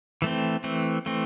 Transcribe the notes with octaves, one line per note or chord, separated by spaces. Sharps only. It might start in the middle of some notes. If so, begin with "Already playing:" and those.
E3 A3 C4
E3 A3 C4
E3 A3 C4